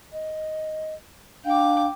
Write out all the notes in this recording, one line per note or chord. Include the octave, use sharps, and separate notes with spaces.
D#5
D4 F5 G5 D6